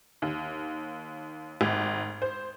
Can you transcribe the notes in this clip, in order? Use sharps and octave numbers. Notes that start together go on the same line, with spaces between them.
D#2
G#1
C5